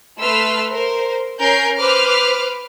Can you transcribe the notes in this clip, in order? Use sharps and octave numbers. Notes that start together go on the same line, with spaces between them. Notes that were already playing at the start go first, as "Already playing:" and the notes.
A3 B4 C6 E6 F6
A#4 C5
C#4 A#4 G6 C7
B4 C5 D6 F6